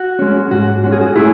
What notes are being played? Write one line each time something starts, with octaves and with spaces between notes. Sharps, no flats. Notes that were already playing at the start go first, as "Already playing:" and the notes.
Already playing: F#4
G#3 C#4
G#2 F#4
G#3 C#4 F#4
G#4
F#4
A2 E4 G#4